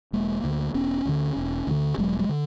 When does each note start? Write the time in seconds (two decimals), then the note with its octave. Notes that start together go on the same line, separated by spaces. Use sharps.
0.13 E1 G#3 A#3
0.44 D2 D3
0.74 E1 B3 C#4
1.05 D2 D3
1.36 E1
1.67 D2 D3
1.98 E1 F#3 G#3
2.19 F#3 G#3
2.29 D3